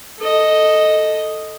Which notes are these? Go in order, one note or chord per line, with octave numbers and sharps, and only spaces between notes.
A4 D#5